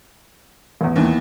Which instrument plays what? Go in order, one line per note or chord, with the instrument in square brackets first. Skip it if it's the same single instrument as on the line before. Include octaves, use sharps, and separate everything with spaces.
[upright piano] A1 E2
[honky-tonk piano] D#2 E3 B3